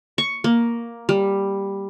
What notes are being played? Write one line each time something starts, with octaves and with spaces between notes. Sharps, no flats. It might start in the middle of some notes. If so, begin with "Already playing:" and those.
C#6
A#3
G3